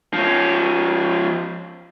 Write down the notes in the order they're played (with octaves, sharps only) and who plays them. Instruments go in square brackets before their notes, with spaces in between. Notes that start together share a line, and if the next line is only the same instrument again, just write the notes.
[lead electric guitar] F3 C#4